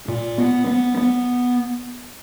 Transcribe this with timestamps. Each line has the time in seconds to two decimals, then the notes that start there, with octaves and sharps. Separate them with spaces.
0.08 A#2
0.38 B3
0.67 B3
0.97 B3